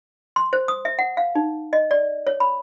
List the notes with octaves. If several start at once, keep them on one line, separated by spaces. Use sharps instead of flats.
C6
C5
D#6
E5
F#5
F5
D#4
D#5
D5
C#5
B5